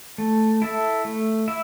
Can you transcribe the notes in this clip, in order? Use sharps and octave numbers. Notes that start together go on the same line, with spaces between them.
A3
E4 A4 E5
A3
E4 E5